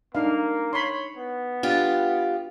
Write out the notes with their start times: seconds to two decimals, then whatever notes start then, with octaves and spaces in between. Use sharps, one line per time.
0.15 A#3 D4 D#4 F5
0.73 C#5 B5 C6
1.17 B3
1.63 D4 F4 G4